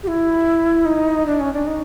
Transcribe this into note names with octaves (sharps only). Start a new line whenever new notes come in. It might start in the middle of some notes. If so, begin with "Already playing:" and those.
G4
E4
D#4
D4
C#4
D4
D#4